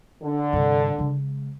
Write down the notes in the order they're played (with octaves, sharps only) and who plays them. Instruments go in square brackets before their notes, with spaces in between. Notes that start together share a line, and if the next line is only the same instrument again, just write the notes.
[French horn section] D3
[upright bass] G2 C3
C#3 G#3